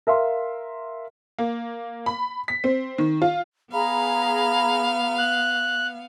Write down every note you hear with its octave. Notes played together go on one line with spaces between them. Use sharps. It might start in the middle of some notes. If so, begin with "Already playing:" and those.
A#4 E5 F5 C6
A#3
B5
B6
C4
D#3
F4
B3 G#4 F5 A#5 B5
F#6